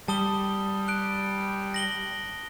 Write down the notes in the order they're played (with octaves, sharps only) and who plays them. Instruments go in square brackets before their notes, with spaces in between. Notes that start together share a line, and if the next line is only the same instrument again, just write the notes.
[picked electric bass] G3 [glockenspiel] A5 D#6 G7
[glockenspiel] F#6 D7
A#6 F#7 G7